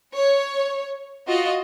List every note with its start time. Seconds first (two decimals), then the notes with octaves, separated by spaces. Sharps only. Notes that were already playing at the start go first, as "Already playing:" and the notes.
0.15 C#5
1.28 F4 F#4 D#5